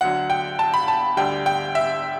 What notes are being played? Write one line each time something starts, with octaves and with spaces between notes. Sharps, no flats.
D2 D3 F#3 F#5
G5
A5
B5
A5
D2 D3 G3 G5
G5
E5